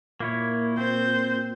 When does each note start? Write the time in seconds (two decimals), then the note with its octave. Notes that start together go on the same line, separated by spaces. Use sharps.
0.20 A#2 A#3 E4 C#5
0.78 C4 C5 G6